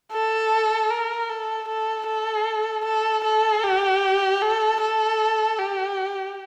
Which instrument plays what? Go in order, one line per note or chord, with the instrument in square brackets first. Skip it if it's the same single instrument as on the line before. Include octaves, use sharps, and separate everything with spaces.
[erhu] A4
A#4
A4
A4
A4
A4
A4
G4
A4
A4
G4